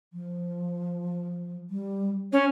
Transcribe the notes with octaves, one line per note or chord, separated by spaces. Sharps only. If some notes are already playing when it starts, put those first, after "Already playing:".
F3
G3
C#4 C#5